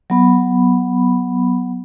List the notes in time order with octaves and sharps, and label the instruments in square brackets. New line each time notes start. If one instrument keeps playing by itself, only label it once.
[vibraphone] F#3 B3 B5